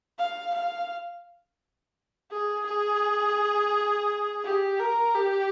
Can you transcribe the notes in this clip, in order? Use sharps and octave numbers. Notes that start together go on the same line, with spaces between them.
F5
F5
G#4
G#4
G4
A#4
G4